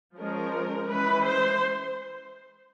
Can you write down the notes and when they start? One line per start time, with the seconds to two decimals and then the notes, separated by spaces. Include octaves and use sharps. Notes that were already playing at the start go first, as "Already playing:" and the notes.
0.17 F3 G#3 C#4 A#4
0.86 E3 G#3 C#4 B4
1.21 C5